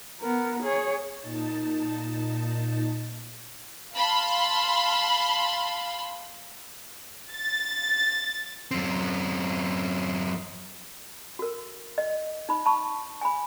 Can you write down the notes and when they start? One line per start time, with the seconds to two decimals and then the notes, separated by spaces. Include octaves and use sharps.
0.21 B3 A#4
0.63 G#4 C#5
1.19 A#2 D#4 A5
3.95 F5 A5 B5 C6
7.33 A6
8.71 F#2 C4
11.39 F#4 A#4
11.98 D#5
12.49 D#4 B5
12.66 A5 B5 C#6
13.21 G#5 B5